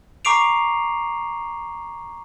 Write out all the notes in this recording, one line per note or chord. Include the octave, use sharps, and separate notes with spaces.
A#5 C#6 D6 C7 D7 F7